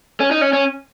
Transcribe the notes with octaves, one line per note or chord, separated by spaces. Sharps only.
C#4
D#4
C#4
C#4